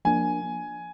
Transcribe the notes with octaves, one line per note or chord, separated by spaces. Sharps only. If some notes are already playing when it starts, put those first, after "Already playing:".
F3 A#3 D4 G#5